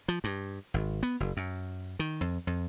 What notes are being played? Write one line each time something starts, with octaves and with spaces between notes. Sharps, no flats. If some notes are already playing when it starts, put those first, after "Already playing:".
F3
G2
G#1
B3
F#1
F#2
D#3
F2
F2